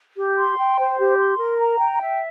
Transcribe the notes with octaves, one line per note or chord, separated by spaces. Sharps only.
G4
C6
G5
C5
G4
C6
A#4
A#5
G5
E5